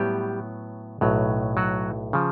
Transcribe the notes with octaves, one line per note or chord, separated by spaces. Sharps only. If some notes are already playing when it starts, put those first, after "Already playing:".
Already playing: A2 F#3 G3 B3 G4
B1 A2 F#3
F#3 F#4
C#3 F3